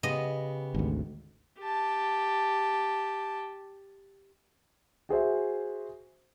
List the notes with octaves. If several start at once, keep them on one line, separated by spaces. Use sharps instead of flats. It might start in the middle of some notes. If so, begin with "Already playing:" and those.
C#3 B3 G4 D#5
G#1 D2
G4 A5
F#4 G#4 C5 E5